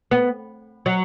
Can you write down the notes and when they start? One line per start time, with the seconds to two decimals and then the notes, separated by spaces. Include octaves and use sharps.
0.11 B3
0.86 F#3